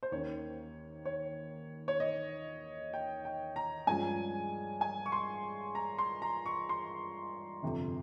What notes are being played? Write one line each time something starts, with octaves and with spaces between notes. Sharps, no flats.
C5
D#2 D#3 A#3 C#4 C#5
C#5
C#5
D#5
G5
G5
A#5
G2 F3 G#3 C#4 G#5
G#5
C#6
C6
A#5
C6
A#5
C#6
C6
G1 F2 C3